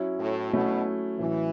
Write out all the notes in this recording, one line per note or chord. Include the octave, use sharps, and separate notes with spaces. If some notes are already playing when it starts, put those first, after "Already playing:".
Already playing: F#3 C#4 E4
A2
B2 F#3 A3 C#4 E4
A2 E3 F#3 C#4